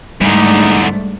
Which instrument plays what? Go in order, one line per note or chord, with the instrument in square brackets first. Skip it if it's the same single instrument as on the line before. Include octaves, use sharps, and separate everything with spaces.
[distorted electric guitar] E2 D3 [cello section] G#2 A3 D4 [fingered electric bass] G3 [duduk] D#4